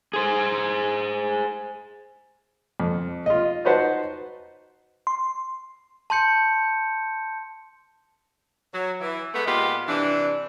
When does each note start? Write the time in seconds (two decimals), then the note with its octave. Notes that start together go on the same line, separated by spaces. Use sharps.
0.13 G#4 C5
2.80 F2
3.26 F4 D#5
3.65 D#4 F#4 B4 C5 F#5 A5
5.07 C6
6.10 A5 C6 G6 C#7
8.73 F#3
9.01 E3
9.34 G#3 A3 B3
9.46 A#2 G#3 B3 F4 G4
9.88 C3 E3 D4